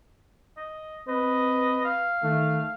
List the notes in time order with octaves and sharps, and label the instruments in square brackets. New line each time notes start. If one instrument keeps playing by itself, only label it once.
[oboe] D#5
[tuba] C4 [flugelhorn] B4 [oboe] D#5
[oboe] F5
[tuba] D#3 [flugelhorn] A3